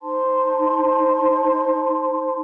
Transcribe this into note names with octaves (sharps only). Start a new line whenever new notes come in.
D#4 C5 A5 C6